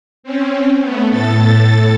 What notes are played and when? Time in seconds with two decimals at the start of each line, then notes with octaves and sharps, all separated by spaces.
0.23 C4 C#4
0.82 A3 B3
1.10 A2 A4 A6